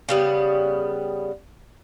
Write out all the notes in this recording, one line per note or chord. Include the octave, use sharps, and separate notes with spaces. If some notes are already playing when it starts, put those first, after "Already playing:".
C#3 G3 B3